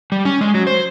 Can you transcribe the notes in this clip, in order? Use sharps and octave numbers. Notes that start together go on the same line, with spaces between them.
G3
C#4
G#3
F#3
C5